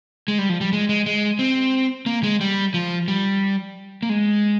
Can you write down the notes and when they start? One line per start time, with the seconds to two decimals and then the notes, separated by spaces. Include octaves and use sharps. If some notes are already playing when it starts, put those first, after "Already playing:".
0.28 G#3
0.39 G3
0.49 F3
0.61 G3
0.73 G#3
0.89 G#3
1.06 G#3
1.39 C4
2.06 A#3
2.23 G#3
2.41 G3
2.74 F3
3.08 G3
4.03 A#3
4.09 G#3